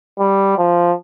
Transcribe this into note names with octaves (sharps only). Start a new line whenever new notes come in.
G3
F3